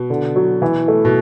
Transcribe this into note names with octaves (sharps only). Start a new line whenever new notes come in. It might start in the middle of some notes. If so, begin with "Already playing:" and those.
Already playing: B2
D3
F#3
E3
A3
B2